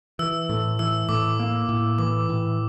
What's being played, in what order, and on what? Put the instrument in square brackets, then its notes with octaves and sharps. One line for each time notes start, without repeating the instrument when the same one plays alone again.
[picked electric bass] E3 [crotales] E6
[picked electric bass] A2
[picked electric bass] E3 [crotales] E6
[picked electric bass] A2 [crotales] D6
[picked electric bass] A#3
A2
[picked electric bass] E3 [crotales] D6
[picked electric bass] A2